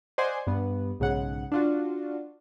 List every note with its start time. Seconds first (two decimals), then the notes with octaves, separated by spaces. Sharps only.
0.18 C5 D5 D#5 F#5 G#5 C6
0.47 G2 B3
1.00 B1 G#2 C#3 F#5
1.52 D4 F4 F#4